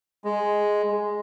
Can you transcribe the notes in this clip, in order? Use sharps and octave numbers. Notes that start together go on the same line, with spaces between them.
G#3